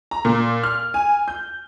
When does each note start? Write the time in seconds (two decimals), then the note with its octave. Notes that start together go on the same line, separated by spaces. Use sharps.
0.11 A#5
0.25 A#2
0.63 F6
0.94 G#5
1.28 G6